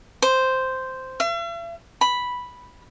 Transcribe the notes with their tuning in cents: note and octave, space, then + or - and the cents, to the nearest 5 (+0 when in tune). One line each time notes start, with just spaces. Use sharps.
C5 -5
E5 +45
B5 -5